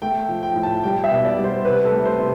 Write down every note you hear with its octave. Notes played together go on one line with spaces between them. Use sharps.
A3 G5
F3
G5
A2
A5
G3 G5
E5
B2
D5
G3
C5
C3 B4
A4
A3
C5
C3